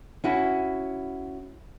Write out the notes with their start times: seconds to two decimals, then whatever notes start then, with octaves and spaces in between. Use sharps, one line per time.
0.24 C#4 E4 F#4